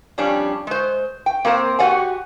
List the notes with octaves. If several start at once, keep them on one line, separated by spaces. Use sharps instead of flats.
F2 G3 C#4 D4
G#3 C5
G5
A#3 C4 A#4 C5
F#4 G4 A4 D5 F#5 G#5